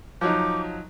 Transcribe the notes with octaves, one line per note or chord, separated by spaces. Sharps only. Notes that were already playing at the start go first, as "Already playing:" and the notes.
F3 F#3 D#4 D6